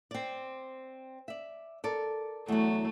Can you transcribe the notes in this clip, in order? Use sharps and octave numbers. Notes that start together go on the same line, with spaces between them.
C4 D5
D5 E5
A4 A#4 D5
E2 F#3 A3